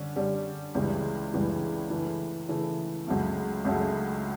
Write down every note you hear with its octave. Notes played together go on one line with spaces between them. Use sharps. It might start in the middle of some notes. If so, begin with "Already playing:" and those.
Already playing: D3 G3 C#4
D3 G3 C#4
C#2 C#3 E3 G3
C#2 C#3 E3 G3
C#3 E3 A3
C#3 E3 A3
C#2 C#3 F#3 A3
C#2 C#3 F#3 A3